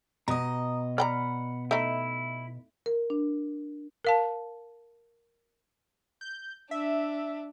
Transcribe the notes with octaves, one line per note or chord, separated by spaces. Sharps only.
B2 D#5 A#5 D#6
D5 F#5 G5 A#5 B5 F6
A3 D#4 E4
A#4
D4
A#4 F5 A5
G6
D4 E5